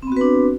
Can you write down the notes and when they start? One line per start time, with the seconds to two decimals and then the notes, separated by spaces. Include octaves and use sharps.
0.02 C4
0.07 B3
0.12 F#4
0.17 B4
0.21 D4